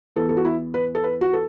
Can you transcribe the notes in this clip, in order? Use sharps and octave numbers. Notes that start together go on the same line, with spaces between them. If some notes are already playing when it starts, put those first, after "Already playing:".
E2 E3 B3 A4
A4
F#4
E4
B4
A4
B4
F#4
A4